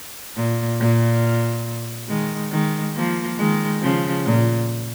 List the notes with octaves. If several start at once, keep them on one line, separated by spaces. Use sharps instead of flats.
A#2
A#2
D#3 G#3
D#3 G#3
F3 A#3
D#3 G#3
C#3 F3
A#2